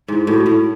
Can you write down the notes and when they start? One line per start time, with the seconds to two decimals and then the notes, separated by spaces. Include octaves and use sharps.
0.08 G#2 E4
0.27 A2 F#4
0.46 A2 E4